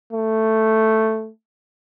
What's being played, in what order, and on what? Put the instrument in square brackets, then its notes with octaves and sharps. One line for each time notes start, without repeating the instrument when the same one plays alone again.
[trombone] A3